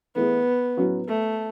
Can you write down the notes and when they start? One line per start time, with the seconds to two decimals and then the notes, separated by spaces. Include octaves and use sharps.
0.15 E3 A3 B3 E4 G#4
0.77 A2 F#3 C#4 F#4
1.08 A3